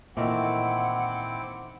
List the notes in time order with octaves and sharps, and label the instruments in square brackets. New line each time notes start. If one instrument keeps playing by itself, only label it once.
[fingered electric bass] A#2 [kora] D#3 E3 A3 [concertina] C4 E4 D6 [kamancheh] F#5